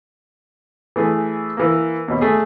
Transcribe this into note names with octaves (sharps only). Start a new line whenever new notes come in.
E3 A3 G#4
E3 A#3
D#2 B2
A3 G#4